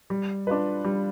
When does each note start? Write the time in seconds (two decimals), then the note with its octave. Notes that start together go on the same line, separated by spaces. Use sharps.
0.10 G3
0.47 D4 F4 B4
0.84 G3